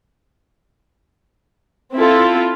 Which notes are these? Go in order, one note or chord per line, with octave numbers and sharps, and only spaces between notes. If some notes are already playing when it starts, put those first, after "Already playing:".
C4 E4 F4 A4